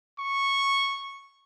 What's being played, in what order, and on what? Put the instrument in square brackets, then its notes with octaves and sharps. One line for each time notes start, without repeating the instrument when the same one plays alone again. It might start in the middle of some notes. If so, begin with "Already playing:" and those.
[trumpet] C#6